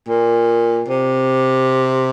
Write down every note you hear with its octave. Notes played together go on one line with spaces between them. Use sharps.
A#2
C3